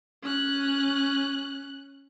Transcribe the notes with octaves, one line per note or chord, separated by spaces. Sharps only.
C#4 F#6